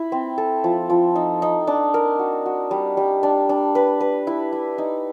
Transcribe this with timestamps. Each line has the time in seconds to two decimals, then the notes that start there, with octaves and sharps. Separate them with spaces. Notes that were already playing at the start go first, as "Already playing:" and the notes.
Already playing: E4
0.12 C4
0.38 A4
0.64 F3
0.90 F3
1.15 D#4
1.42 D#4
1.67 D4
1.94 A#4
2.19 F#4
2.46 F#4
2.71 G3
2.97 G3
3.23 D4
3.49 D4
3.75 B4
4.00 B4
4.27 E4
4.52 E4
4.78 D#4